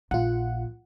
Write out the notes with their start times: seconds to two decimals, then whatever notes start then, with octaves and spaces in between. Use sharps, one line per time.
0.11 A#1 F4 F#5